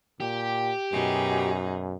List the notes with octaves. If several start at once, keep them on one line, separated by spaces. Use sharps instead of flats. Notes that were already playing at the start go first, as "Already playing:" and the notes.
A#2 G4
F#2 B2 D#4 G#4